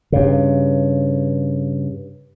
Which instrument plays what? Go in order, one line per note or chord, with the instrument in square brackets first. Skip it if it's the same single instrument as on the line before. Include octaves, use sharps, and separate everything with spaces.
[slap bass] G2 C#3